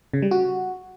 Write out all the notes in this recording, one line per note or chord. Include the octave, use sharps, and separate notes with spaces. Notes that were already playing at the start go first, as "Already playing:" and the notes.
C#3
G3
F#4